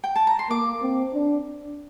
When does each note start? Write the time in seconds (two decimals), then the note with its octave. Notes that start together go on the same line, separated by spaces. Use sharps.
0.04 G5
0.16 A5
0.27 A#5
0.39 C6
0.49 A#3 D6
0.81 C4
1.14 D4